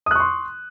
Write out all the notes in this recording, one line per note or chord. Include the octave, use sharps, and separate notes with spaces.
C6 C#6 D#6 F#6